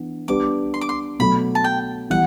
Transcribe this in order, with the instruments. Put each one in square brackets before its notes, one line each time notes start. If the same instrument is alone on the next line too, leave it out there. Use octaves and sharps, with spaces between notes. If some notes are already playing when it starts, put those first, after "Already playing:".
Already playing: [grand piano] E3 B3 D4
[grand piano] G3 B3 D4 G4 B4 [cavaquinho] D6
[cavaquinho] C6
D6
C6
[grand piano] B2 F#3 A3 [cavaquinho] B5
[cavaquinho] A5
G5
[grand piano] E3 G3 B3 E4 [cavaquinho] F#5